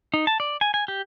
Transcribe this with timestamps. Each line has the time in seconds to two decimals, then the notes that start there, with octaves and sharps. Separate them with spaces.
0.14 D#4
0.27 A5
0.40 D5
0.61 G#5
0.74 G#5
0.88 G4